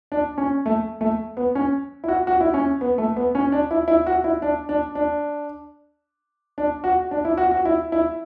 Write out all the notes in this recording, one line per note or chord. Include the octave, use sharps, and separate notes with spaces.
D4
C#4
A3
A3
B3
C#4
E4
F#4
F#4
E4
C#4
B3
A3
B3
C#4
D4
E4
E4
F#4
E4
D4
D4
D4
D4
F#4
D4
E4
F#4
F#4
E4
E4